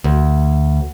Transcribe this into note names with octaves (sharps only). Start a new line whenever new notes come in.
D2